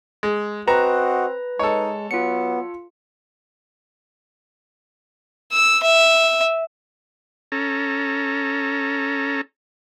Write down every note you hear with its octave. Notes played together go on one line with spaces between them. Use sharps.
G#3
C4 F#4 B4 D#5 F#5 A#5
G#3 D#4 A4 C#5
F#3 B3 F4 C#7
E6
E5
C#4 A4 A#5